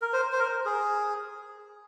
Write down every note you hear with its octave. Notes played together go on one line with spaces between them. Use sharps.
A#4
C5
C5
A#4
G#4